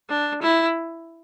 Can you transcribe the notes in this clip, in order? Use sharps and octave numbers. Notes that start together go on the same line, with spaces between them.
D4
E4